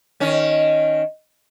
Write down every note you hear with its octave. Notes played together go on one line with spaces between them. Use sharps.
D#3 C#4